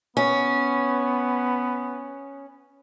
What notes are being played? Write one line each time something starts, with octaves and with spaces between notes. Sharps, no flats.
B3 C#4